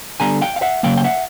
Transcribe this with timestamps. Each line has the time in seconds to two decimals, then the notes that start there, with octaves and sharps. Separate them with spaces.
0.20 D3 G3 B3 G#5 A#5
0.41 F5 G5
0.56 F5
0.62 E5 F#5
0.83 C#3 F#3 A#3 F5 G5
0.97 G5
1.04 E5 F#5